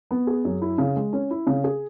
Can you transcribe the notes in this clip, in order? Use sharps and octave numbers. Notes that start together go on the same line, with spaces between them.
B3
G#4
F#2
E4
C#3
G#3
C#4
E4
C#3
G#4